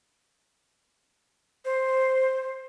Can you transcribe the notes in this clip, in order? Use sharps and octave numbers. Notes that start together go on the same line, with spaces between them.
C5